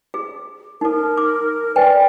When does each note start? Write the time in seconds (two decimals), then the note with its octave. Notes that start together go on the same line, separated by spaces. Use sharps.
0.14 G#4
0.81 D#4 A4 A#4
1.17 D6
1.76 B4 D5 G5 G#5